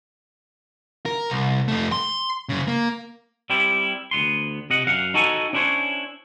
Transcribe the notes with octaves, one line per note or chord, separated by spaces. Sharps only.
A#4
C2
F2 A3
C6
F#2 C#3
A#3
G3 C4 E4 G4
D2 G#2 B3 C6
C3 D#5 F#5
F#2 F5 F#5
D#4 F#4 A4 C#5 G#5
C#4 D4 E4 A#4 C5 C#5